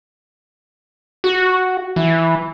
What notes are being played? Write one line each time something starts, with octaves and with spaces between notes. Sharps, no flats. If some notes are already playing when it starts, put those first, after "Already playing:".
F#4
E3